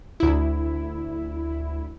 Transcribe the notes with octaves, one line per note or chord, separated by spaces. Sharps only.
D2 E4